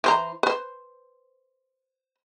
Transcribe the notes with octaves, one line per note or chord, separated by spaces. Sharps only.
E3 C5 A#5
B4 C5